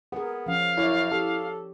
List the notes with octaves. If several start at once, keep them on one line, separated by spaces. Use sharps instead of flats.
B3 G#4 A#4
F3 C#4 F5
F#2 E4 C#5 D5
G4 A4